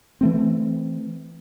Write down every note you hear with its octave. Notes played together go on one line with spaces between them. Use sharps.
E3 A3 C4